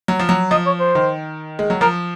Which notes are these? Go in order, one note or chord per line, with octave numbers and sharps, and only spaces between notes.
F#3
F3
F#3
F3 D#5
C#5
C5
D#3
G#3
F#3
F3 A#4